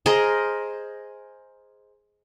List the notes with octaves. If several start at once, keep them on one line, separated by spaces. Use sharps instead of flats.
G#4 A#4 C5 D#5